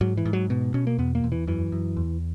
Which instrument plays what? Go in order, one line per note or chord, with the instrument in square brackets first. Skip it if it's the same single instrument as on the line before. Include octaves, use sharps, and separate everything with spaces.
[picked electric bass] G#2 F#3
E3
G#2
F#3
B2
B2 C#4
A#3
E2 B3
A#3
E2
E3
F#2 E3
F#2
E2